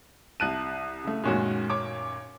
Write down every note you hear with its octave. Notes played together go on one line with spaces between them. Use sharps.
C2 A5 F#6 D#7
C#3 A3
F#2 A#2 D#3 G#3 C#4 F#4
C#5 D6